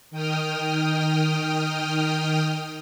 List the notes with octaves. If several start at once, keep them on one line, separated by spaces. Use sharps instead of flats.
D#3 G5 D#6 F6